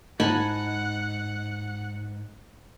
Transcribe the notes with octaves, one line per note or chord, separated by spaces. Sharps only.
G#2 D#4 F#5 G#5 A5 B5